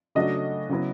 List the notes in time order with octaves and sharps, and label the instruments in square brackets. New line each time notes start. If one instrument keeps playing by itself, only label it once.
[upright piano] C#3 F#3 A3 D4 F#4 [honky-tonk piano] D#5
[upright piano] C#3 F#3 B3 E4